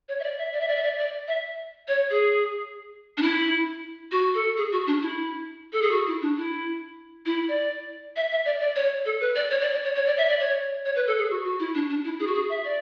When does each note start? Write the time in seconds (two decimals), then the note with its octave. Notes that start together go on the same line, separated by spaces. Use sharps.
0.08 C#5
0.19 E5
0.24 D5
0.38 E5
0.53 D5
0.60 E5
0.68 D5
0.76 E5
0.83 D5
0.98 D5
1.27 E5
1.88 C#5
2.10 G#4
3.17 D4
3.22 E4
4.12 F#4
4.34 A4
4.57 G#4
4.72 F#4
4.87 D4
5.01 E4
5.73 A4
5.82 G#4
5.91 F#4
6.07 E4
6.22 D4
6.37 E4
7.26 E4
7.48 D5
8.16 E5
8.31 E5
8.45 D5
8.60 D5
8.76 C#5
9.05 A4
9.20 B4
9.36 D5
9.50 C#5
9.61 D5
9.73 D5
9.84 C#5
9.95 C#5
10.06 D5
10.17 E5
10.29 D5
10.40 C#5
10.85 C#5
10.96 B4
11.07 A4
11.18 G#4
11.30 F#4
11.44 F#4
11.59 E4
11.75 D4
11.89 D4
12.04 E4
12.20 G#4
12.27 F#4
12.35 G#4
12.49 E5
12.65 D5